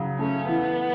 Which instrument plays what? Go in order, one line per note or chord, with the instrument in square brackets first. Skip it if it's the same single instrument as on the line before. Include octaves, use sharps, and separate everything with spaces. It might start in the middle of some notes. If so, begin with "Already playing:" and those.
Already playing: [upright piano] C#3 F#3
[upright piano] A3 [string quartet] C#4
[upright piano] E3 [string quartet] B3